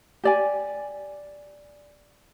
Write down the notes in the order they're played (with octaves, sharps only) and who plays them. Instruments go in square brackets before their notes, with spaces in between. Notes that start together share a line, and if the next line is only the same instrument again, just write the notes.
[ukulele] G4 D5 G#5